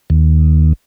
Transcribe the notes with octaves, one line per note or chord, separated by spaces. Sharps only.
D#2